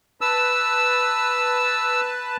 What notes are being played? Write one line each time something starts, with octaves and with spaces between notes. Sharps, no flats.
B4 A5 E6